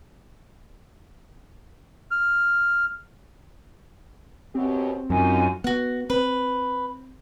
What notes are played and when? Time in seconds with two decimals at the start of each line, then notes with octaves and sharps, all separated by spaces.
2.11 F6
4.55 F#2 B2 C4 G4
5.10 F#2 F#3 D#4 F4 G#5
5.64 B3 F#4 F#5
6.10 C4 B4